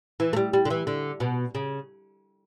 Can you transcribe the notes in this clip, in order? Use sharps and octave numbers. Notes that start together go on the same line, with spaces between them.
E3
A3
G3
G3
D3
E3
D3
B2
C#3